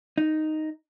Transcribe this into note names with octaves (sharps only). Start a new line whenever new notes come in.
D#4